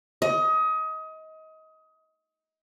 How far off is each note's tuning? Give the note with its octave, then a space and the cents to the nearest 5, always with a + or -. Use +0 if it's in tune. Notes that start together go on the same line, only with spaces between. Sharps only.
D#5 +25